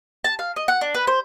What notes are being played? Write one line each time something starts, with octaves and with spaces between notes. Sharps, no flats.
A5
F5
D#5
F#5
D4
B4
C5